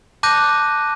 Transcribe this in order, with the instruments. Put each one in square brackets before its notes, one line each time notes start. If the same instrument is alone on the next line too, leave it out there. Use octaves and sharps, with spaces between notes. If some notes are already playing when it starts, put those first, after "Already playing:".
[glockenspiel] A5 D6 F#6 G6 A#6 D#7